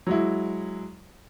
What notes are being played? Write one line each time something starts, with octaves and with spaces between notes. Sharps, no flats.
F#3 G#3 E4